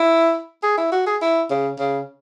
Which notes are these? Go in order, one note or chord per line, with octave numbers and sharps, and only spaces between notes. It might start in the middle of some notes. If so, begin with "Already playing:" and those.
Already playing: E4
G#4
E4
F#4
G#4
E4
C#3
C#3